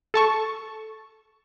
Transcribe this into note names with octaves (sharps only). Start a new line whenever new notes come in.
A4 A5 C#6